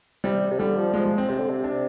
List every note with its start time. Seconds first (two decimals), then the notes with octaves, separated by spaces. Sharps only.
0.24 C3 G3
0.51 C3
0.59 D3 G3
0.77 F3
0.94 F3 G#3
1.06 G#3
1.18 C4
1.29 C3 C4
1.39 D3
1.50 C3
1.64 D4